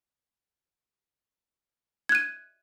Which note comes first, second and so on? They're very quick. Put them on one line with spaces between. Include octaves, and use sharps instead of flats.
G#6 F#6 D#7